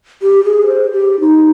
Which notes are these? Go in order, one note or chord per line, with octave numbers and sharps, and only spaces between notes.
G4
G#4
C5
G4
D#4